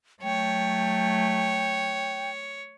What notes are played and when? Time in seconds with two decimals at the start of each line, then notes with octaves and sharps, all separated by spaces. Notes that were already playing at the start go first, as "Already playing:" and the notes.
0.23 F#3 A3 C#5 G5